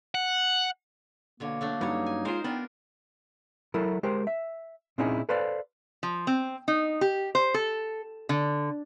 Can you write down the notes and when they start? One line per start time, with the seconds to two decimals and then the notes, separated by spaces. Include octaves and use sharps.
0.15 F#5
1.40 B2 D3 A#3 C#5
1.61 F#3 A3 D4
1.81 G2 F#3 C#4 D#4 C#5
2.06 G#5
2.25 G#3 F4 A#4 C5
2.44 B3 D4 F4 A#4 G5
3.74 F#3 E4 A4 A#4
4.03 G#3 G4 A#4 C5
4.27 E5
4.98 A#2 C4 C#4 D#4 E4 G#4
5.29 A4 B4 C5 D5 F5
6.03 F3
6.27 C4
6.68 D#4
7.01 G4
7.35 C5
7.54 A4
8.29 D3